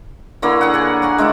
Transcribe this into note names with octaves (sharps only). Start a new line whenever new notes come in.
D3 A#3 E4 C#5
G#4 F#5
D5 G#5
C#5 F#5 G#5
G#3 A3 D4 E4